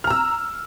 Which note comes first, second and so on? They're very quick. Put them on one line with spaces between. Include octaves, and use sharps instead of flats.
F6 A#5 E6